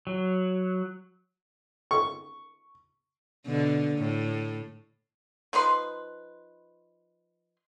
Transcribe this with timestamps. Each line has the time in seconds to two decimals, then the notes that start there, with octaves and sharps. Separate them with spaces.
0.07 F#3
1.91 C#6
3.47 B2 D3
3.98 A2
5.53 F3 D#4 B4 C6